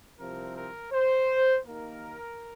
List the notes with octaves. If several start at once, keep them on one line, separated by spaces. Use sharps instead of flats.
C2 C3 F3 C4 A#4
A#4
C5
D#2 D#3 A#3 A#4